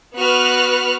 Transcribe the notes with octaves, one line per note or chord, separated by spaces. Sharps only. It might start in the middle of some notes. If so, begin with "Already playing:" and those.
B3 F#4 B4 F6 F#6